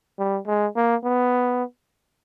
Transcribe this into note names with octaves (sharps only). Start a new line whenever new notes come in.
G3
G#3
A#3
B3